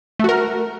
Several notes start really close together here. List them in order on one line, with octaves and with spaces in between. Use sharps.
A3 F#4 A#4